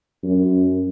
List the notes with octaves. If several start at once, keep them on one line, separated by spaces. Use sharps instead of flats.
F#2